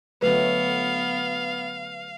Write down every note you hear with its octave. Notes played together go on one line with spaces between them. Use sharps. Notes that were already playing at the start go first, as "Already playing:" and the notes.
D3 F#3 A3 B3 B4 F5